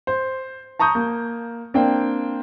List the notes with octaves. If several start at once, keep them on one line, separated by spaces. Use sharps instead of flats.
C5
A5 A#5 C#6 D#6 G6
A#3
A#3 C4 D4 G5